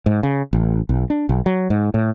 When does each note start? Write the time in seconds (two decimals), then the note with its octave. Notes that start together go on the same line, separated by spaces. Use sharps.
0.06 G#2
0.23 C#3
0.53 A1
0.89 B1
1.10 D4
1.29 B1
1.46 F#3
1.70 G#2
1.94 A2